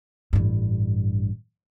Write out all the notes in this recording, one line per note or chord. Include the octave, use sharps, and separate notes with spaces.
A1 G2